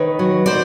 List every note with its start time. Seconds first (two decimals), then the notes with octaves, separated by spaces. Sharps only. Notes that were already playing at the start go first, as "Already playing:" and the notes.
Already playing: D#3 B4 C#5
0.19 F#3
0.46 C5 D5